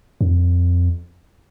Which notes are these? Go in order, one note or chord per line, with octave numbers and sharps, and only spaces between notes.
F#2
F2